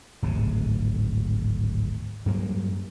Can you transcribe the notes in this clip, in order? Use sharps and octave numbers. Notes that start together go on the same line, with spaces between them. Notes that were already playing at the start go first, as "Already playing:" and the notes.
D1 G#1 G#2 C3
G2 F#3 A#3